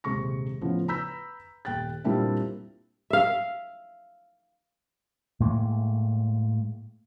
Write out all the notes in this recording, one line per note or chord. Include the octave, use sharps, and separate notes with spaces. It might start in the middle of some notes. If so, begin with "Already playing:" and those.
D#1 C3 G#3 C#6 A#6
A2 C#3 F3 B3
B4 A#5 B5 E6 G6 B6
D#1 G5 F#6 A6
A#2 G3 A#3 C4 D4 E4
E5 F5
A2 G#3 A#3